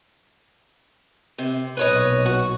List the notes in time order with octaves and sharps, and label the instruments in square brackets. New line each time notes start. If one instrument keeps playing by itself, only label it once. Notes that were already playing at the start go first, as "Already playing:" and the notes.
[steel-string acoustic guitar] C3
[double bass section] B1 A#2 [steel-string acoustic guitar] B4 C#5 D#5
[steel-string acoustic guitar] F#4